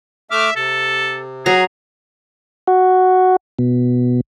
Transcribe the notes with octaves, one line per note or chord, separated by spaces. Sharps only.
A3 E5 D6 F6
C3 A4
F#3 G#4 A#5
F#4
B2